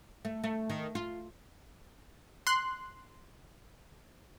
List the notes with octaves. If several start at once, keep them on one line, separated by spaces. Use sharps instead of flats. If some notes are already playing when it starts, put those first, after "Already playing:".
A3
A3
D#3
F4
C6 F#6